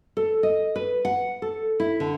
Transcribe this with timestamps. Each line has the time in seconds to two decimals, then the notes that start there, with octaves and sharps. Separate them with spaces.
0.17 A4
0.43 D#5
0.76 B4
1.05 F#5
1.42 A4
1.80 E4
2.00 D3